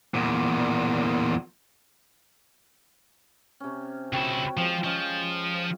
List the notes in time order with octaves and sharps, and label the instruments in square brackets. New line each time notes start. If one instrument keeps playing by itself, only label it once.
[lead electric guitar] E2 A#2
[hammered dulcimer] C3 C#4
[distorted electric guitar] C#2 E4 [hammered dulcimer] F#4 C#5 G5
[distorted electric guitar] F3 [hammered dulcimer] G#3 C4 F4
[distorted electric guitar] F3 [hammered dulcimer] C#4 D#5 F5